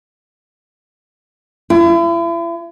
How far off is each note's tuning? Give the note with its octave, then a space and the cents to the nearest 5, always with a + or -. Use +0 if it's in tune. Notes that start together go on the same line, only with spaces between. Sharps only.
E4 +40